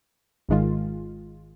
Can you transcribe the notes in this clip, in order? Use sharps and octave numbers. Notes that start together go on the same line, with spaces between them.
G#1 G#2 D#3 G#3 F4